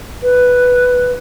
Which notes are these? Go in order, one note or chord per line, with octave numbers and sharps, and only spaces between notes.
B4